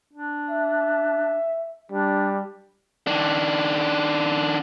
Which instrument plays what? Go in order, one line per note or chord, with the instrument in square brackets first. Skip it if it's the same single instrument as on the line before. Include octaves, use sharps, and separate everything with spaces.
[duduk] D4
[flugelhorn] E5
[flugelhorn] G3 [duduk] D4
[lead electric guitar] D#3 D4